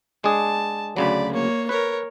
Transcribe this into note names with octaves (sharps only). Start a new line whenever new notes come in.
G#3 D4 G#4 A5
D2 C#3 F#3 D5 B5
A#3 C#5
A#4 B4 C#5